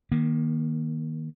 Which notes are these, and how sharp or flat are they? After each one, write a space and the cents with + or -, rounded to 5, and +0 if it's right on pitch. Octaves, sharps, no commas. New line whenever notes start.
D#3 +0 A#3 +30